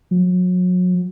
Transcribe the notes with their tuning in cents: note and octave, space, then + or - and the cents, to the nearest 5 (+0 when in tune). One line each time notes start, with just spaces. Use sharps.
F#3 -35